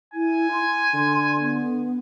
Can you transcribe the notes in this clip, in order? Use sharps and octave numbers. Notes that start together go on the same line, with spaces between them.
E4 G#5
C6
D3
B3